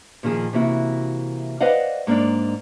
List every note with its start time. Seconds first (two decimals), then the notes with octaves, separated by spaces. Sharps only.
0.23 A#2 D#3 F3 G#4
0.53 C3 E3 A#3 E4 F#4
1.61 B4 C5 D5 D#5 F5 F#5
2.07 G#2 A#3 D4 A#4 D5